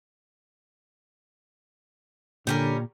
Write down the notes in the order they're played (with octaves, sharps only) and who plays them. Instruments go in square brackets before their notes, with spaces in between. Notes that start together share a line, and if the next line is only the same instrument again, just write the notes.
[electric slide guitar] A#2 [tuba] D3 [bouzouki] G3 C#4 A#4